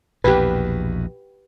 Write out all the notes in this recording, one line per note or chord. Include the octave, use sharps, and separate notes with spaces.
A#1 E2 B2 G4 B4